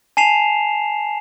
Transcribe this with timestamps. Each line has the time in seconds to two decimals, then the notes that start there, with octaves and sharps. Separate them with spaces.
0.17 G#5 A5 C7 E7 F7